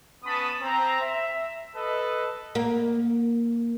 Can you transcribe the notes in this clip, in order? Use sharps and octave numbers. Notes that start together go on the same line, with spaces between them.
B3 C#4 A5 B5 D#6
C4 A#5
E5
A4 B4 D#5
A#3